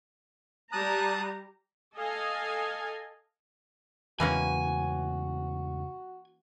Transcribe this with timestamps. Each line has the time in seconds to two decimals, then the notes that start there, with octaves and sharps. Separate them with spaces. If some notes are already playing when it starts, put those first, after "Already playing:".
0.72 G3 A5 A#5 D#6 F#6
1.96 A4 D#5 F5 G#5
4.20 E2 G#2 C#3 E3 A#3 C#4 F#4 G#5